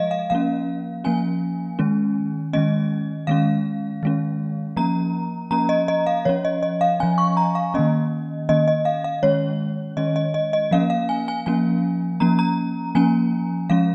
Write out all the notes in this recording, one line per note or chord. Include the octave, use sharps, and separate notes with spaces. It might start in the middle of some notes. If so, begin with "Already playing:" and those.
Already playing: F3 G#3 D#5 F5
F5
F3 A#3 C#4 F5
F3 A#3 C#4 G#5
D#3 G#3 C#4
D#3 G#3 C#4 D#5
D#3 G#3 C#4 F5
D#3 G#3 C#4
F3 A#3 C#4 A#5
F3 A#3 C#4 A#5
D#5
D#5
F5
F3 C#4 C#5
D#5
D#5
F5
F3 C#4 G#5
C#6
A#5
F5
D#3 A#3 C#4 D#5
D#3 A#3 C#4 D#5
D#5
F5
F5
D#3 G#3 C#4 C#5
D#3 G#3 C#4 D#5
D#5
D#5
D#5
F3 A#3 C#4 F5
F5
G#5
G#5
F3 A#3 C#4 G#5
F3 A#3 C#4 A#5
A#5
F3 A#3 C#4 G#5
F3 G#3 C#4 F5